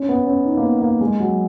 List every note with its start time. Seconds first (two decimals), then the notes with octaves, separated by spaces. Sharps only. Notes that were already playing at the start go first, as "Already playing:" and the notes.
Already playing: C#4
0.09 B3
0.27 C#4
0.45 D#4
0.57 A#3
0.64 B3
0.82 A#3
1.01 G#3
1.20 F#3